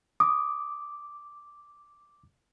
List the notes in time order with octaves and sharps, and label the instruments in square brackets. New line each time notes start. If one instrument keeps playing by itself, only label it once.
[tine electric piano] D6 [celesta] D#6